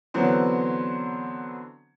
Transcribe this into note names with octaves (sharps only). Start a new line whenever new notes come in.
D3 E3 F#3 B3 C4